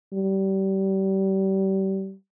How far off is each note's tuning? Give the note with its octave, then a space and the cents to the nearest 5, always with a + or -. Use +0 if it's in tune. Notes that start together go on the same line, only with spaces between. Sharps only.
G3 -30